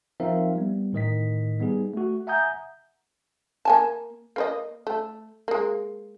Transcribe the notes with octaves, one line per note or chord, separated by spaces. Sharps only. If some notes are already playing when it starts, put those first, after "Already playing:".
F3 C4 D#4 A#4 E5 F5
G3 B3
A2 D#3 D#5 B6
G3 B3 D#4 G#4
A3 F#4
E5 F#5 G#5 A#5 D#6 G6
A#3 G#5 A5
A#3 B4 D#5
A3
G#3 A#3